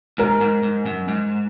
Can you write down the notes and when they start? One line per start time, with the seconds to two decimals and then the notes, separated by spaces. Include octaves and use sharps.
0.18 G#2 A#4
0.41 G#2
0.63 G#2
0.86 F#2
1.08 G#2